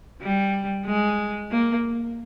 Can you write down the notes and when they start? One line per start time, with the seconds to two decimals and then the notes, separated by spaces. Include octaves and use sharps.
0.21 G3
0.86 G#3
1.51 A#3